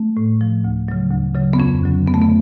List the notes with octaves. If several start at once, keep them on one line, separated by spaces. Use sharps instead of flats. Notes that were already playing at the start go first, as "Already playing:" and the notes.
Already playing: A3
A2
F3
D2
C#3 F#3
D2
C#3 F#3
B3
F2 C#4
D3 F#3
F2 B3
A3
B3